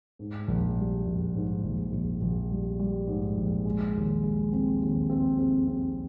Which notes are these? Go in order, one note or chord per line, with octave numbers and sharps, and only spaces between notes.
G#2
A#1
G3
A#1
G#2
A#1
A#1
A#1
G3
G3
G#2
A#1
G#3
D#2
G#3
C4
D#2
C4
C4
C4